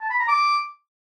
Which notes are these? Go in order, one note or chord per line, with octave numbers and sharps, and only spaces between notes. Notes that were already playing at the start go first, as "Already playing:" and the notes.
A5
B5
A#5
D6